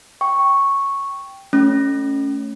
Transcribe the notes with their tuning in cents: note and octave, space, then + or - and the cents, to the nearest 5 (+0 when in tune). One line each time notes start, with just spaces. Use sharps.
G5 +0 C#6 -5
A3 +0 C#4 +0